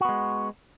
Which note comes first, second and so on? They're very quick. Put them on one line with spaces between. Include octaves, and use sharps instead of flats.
F#4 B3 G#3